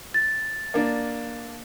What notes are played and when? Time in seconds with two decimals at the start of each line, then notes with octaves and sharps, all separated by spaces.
0.14 A6
0.74 A#3 D4